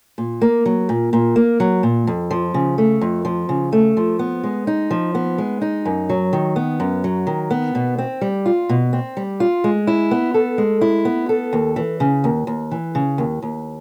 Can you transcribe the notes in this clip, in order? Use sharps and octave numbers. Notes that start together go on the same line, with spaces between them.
A#2
A#3
F#3
A#2
A#2
A#3
F#3
A#2
F2
F3
C#3
A3
F2
F3
C#3
A3
F3
B3
G#3
D#4
F3
B3
G#3
D#4
F#2
F#3
D#3
B3
F#2
F#3
D#3
B3
B2
C4
G3
F4
B2
C4
G3
F4
G#3
E4
B3
A4
G#3
E4
B3
A4
D#2
E3
C#3
D#2
D#2
E3
C#3
D#2
D#2